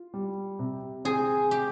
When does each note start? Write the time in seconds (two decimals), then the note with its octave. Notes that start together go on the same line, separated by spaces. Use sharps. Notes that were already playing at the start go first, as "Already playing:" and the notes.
Already playing: F4
0.14 G3
0.59 C3
1.05 C4 G#4
1.51 G4